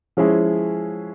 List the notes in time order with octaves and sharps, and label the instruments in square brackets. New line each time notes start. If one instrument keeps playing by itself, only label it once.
[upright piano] F3 G#3 C#4 E4 G#4